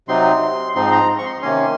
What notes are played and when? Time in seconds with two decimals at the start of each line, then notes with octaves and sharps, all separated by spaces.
0.08 C3 F#3 C4 D#4 C6
0.75 G#2 F3 C4 D#4 C6
0.92 A#5
1.18 C#6
1.26 C6
1.42 C3 D#3 A#3 C#4 C6